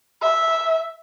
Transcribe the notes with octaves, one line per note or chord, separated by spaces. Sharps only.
E5